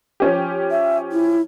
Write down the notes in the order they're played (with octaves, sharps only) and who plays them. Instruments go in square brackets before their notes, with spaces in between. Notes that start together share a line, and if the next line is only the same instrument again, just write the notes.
[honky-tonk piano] F3 C#4 G4
[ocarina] E5
E4